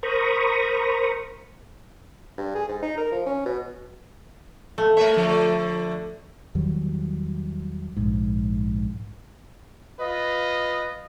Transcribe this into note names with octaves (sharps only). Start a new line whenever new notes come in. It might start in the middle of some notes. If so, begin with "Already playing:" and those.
A#4 C5 A#5 B5 C#6 D#6
G2
G#4
G#2
D#4
A#4
F3
C#4
B2
A3
A3 A#4 C#5 E5
D3 F3 A3
E2 D#3 F#3 G3
A#1 G#2
F4 B4 D#5